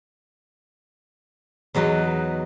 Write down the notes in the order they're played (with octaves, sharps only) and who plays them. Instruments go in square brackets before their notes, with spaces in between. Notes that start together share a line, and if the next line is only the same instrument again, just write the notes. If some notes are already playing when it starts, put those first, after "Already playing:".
[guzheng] E2 F#3 D#4 B4